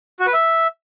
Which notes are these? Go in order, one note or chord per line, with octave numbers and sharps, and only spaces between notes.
F#4
B4
E5